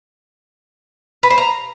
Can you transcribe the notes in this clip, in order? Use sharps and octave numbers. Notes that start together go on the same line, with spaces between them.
B4
C5
A#5